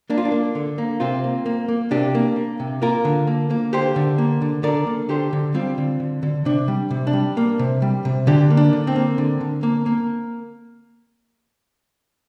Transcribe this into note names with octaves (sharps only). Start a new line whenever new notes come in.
A#3 D4
F4
D4
A#3
D3
A#3
C3 C4 F4
A#3
A#3
A#3
C3 D4 G4
A#3
A#3
C3
A#3 F4 A#4
D3
A#3
A#3
D3 G4 C5
D3
A#3
D3
D3 A#4 D5
A#3
D3 G4 C5
D3
G3 C4 F4
D3
D3
D3
C3 D4
G3
C3
D4
G3
A#3
C3
G3
C3
D3 D4 G4
A#3
D4
D3
C4
A#3
D3
D3
A#3
A#3